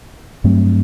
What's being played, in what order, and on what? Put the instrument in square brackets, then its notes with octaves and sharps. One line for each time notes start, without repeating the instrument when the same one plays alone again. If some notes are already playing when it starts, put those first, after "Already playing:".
[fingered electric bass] G2 F#3 A3 C4